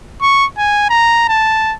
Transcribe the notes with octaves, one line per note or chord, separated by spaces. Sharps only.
C#6
G#5
A#5
A5